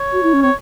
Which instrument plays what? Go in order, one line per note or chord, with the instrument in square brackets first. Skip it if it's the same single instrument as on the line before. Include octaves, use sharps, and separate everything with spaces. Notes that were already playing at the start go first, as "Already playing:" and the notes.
Already playing: [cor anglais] C#5
[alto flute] F#4
E4
C#4
[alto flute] C4 [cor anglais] C#5